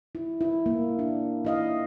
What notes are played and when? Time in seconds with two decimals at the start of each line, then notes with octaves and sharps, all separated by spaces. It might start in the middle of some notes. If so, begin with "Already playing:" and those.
0.15 E4
0.41 E4
0.66 A#3
0.99 D4
1.45 E4 D#5 F5